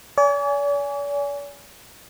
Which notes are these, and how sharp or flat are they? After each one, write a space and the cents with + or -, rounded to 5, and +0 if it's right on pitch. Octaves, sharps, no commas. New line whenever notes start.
D5 -45 G#5 +0